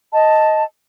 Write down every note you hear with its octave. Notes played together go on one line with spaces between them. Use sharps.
D#5 A5